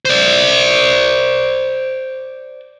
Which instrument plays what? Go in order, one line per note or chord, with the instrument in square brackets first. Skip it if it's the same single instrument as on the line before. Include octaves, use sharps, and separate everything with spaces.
[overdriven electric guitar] C5 D5